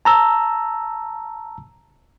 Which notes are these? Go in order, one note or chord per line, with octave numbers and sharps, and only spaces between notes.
A5 A#5 E6